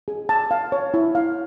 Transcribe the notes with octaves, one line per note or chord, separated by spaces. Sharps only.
G#4
A5
F5
C#5
E4
F5